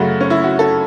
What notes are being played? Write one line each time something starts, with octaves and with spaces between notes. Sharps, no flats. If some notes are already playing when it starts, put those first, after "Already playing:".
Already playing: F#2 C#3 A3 F#4
C#4
E4
F#4
A4